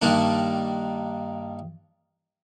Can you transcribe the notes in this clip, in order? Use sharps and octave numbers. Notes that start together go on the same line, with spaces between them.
G2 D#3 A#3 D4